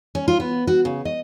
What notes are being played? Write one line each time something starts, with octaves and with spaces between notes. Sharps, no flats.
C#4
F4
B3
F#4
C#3
D#5